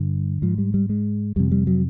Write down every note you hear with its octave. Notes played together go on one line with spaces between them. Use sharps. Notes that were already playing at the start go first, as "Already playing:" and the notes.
Already playing: G2 D3 G3
G#2 F3
G3
G3
G#3
F2 C3 G3
G3
F#3